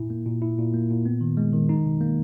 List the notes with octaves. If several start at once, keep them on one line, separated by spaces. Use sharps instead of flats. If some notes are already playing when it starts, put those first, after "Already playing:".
Already playing: A#2 E4
A#3
A#2
E4
A#2
A#3
A#2
B3
D#3
G#3
D#3
D#4
B2
A#3